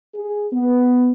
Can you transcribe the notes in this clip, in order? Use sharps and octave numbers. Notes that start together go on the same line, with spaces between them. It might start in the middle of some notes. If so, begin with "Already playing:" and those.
G#4
B3